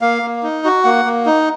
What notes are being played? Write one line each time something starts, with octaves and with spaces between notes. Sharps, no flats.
A#3 F5
A#3
D#4
F#4
A#3 F#5
A#3
D#4